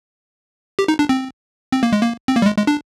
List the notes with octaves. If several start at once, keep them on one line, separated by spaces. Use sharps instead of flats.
G4
D#4
D4
C4
C4
A#3
G#3
A#3
C4
A#3
G3
G#3
G#3
D4